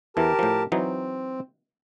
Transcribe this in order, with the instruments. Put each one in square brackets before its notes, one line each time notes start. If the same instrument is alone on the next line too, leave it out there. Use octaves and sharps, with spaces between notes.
[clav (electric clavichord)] E2 E3 [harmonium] G4 A#4 A5
[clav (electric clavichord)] A2 F3
[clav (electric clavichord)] E3 F#3 D#4 [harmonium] C4